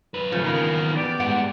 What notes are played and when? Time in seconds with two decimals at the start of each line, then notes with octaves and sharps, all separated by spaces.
0.14 F#2 B4
0.32 C#3 F3 A3
0.44 D#3 E3 A#3 B3 F4 A#4
0.95 B3 G4 D5
1.20 G2 G#3 F#5